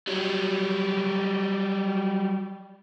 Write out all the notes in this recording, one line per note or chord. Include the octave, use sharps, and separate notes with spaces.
F#3 G3